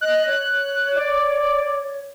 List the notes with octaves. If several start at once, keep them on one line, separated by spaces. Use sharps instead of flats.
D#5 F#6
C#5
D5